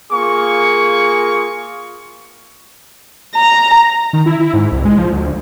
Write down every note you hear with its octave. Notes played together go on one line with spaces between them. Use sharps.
A#3 F4 G#4 C#6
A#5
D#3
E4
E4
G#2
C2
G#3
F3
D2